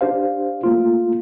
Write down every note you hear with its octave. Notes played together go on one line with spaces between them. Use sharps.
D4 G4 C5 F5
A3 A#3 F4